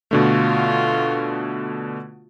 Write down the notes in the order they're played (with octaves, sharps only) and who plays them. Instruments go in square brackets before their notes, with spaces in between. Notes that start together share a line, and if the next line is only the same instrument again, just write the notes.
[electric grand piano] B2 D3 A3 [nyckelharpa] F4 F#4